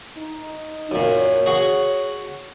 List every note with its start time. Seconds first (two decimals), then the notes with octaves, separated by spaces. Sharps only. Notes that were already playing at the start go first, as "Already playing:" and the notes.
0.17 D#4
0.91 F#2 A#2 C#5
1.46 F#4 G#4